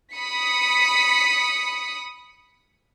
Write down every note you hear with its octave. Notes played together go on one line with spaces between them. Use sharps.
B5 D#6 B6 C#7